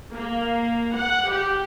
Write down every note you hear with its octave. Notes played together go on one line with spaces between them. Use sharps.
A#3
F#5
G4